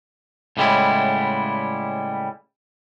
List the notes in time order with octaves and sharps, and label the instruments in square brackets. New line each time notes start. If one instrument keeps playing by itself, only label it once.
[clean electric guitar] A2 C#3 G3 G#3 B3 E4